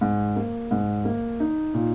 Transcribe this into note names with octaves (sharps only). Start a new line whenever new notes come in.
G#2
A#3
G#2
A#3
D#4
A#2